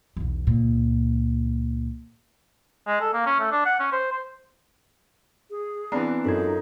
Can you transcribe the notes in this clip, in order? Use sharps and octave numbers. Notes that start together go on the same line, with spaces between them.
B1 E2
C#2 A#2
G#3
A4
A#3
C#4
A3
D4
F#5
C#4
C5
C5
G#4
E3 B3 C4 D4 A#5 C7
F#2 D#4 F4 A4 A#4 G#6